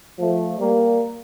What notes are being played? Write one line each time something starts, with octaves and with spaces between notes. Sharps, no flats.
F3 A3
G3 A#3